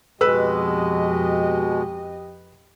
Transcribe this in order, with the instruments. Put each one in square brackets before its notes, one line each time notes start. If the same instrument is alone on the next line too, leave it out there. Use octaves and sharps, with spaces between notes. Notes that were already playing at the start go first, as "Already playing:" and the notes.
[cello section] F2 D#5 [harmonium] B2 G#3 [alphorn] G4 [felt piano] B4 E6